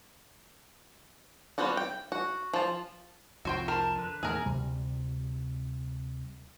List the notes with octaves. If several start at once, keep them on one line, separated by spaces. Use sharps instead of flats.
G3 B3 C4 F4 F#4
G5
F#4
F3 A5
C2 F2 F3 F#4 C5 G5
A#4 C5 A5
D3 B4
E2 A#2 G#4 A#4
D2 C3 G3